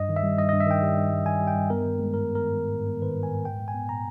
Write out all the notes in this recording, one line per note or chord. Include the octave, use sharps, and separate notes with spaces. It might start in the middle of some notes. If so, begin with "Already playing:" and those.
Already playing: G2 D#5
D#3
E5
G3
G2 D#5
G2 D#5
E5
D#3 G5
G3
G2
G2
D#3 G#5
G3
G5
G2
B3 A#4
D#3
G#3
G#2 A#4
B3
A#4
D#3
G#3
G#2
B3
D#3 B4
G#3
G#5
G#2
A#2 G5
G#3
G#5
B3
A#2 A#5